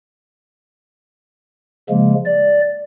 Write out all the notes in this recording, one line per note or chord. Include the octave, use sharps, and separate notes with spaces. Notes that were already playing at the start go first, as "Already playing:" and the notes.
C#3 F3 G#3 A#3
D5